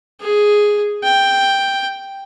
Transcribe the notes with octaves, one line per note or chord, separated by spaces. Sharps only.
G#4
G5